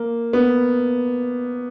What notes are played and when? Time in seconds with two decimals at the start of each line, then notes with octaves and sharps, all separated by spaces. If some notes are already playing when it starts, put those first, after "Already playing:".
Already playing: A#3
0.33 B3